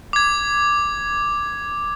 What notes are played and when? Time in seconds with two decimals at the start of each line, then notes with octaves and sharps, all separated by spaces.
0.13 D6 G#6